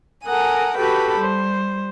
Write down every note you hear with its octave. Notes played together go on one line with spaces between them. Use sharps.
A4 A#4 F#5 G#5 D#6
F#4 G4 A4 B4 G5 B5
G3 C5